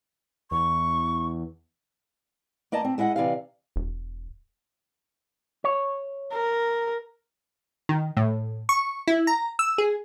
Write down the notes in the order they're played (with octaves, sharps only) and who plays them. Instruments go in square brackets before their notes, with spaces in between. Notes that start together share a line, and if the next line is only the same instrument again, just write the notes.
[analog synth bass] E2 [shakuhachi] C#6
[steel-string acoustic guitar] A#3 D5 D#5 A5 A#5
C4
G#3 E4 D#5 F#5
C3 E3 D5 D#5 F5
[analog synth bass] E1
[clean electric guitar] C#5
[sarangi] A#4
[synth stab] D#3
A2
C#6
E4
A#5
E6
G#4